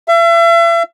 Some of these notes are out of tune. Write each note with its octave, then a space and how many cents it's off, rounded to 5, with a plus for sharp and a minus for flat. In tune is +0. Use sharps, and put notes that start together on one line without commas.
E5 +40